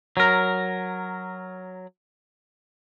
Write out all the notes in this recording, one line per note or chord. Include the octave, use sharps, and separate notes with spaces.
F#3 A#4